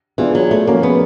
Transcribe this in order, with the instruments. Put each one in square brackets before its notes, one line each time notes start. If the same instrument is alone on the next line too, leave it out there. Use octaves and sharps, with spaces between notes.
[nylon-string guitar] E3 [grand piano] G#3 B3 D4 F4
[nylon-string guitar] F#3
A3
[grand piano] F3 G#3 C#4 F#4 [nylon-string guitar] A#3
[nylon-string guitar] B3